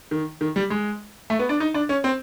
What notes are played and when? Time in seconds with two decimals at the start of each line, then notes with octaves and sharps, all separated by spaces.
0.11 D#3
0.41 D#3
0.56 G3
0.70 G#3
1.30 A3
1.39 B3
1.49 D4
1.60 D#4
1.74 D4
1.89 C#4
2.04 C4